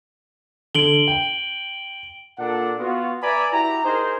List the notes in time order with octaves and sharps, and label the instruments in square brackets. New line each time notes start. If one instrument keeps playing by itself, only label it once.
[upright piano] D3 [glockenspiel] D7 F#7 G7
[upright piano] G5
[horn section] A#2 D4 A4 F#5
B3 F4 F#4
B4 D5 E5 G#5 A#5 B5
E4 F#4 G4 A#5
D#4 G#4 A#4 C5